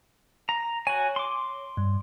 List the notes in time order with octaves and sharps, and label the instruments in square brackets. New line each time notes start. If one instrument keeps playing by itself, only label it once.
[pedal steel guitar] A#5
[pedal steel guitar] F#4 G#5 [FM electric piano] C#5
[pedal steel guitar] C6 D6
[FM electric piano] G2